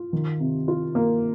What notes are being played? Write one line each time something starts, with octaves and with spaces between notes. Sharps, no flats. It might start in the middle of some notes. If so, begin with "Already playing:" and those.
Already playing: F4
D#3
C3
F4
A#3